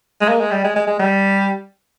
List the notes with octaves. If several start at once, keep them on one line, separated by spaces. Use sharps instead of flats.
G#3
A#3
G#3
G3
G#3
G#3
G#3
G3